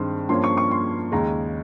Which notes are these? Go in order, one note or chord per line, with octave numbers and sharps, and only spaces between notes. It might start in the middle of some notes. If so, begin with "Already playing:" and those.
Already playing: G2 D#3 G#3 C4 C6
G2 F3 A#3 C#4 C6
C#6
C#6
C6
D#2 C#3 G#3 A#5